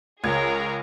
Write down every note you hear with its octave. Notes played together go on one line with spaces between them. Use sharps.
C#2 G#4 A#4 C#5 G#6